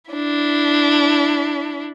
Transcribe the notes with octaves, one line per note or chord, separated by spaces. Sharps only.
D4 E4